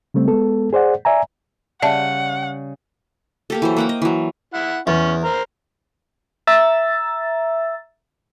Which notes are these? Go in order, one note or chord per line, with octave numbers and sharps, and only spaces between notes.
C#3 G3 A3 C4
G#3 B3 A4
G#4 C5 D5 F#5
D5 E5 G#5 A#5
C#3 G3 D5 E5 F#5 A5
A#3 G4 A4
E3 F#3 C5
A#3 F#5 G5
D#5
E3 F#3
E4 F#5
E2 C#4
A#4 C5
E5 A#5 E6 A6